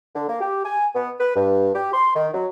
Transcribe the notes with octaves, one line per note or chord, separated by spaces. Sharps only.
D3
A#3
G4
G#5
B3
B4
G2
G4
C6
D#3
F#3